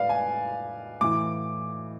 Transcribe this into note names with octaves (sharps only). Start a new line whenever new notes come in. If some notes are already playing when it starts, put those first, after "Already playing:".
Already playing: A2 B4 D5 F5
G#5
A2 E3 D6